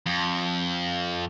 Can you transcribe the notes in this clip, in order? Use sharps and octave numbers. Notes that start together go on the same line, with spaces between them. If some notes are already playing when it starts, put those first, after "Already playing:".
F2